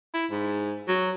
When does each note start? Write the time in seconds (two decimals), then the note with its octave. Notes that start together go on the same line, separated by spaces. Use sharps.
0.14 E4
0.31 G#2
0.88 F#3